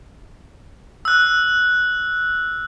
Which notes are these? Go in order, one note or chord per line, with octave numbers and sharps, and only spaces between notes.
E6 F#6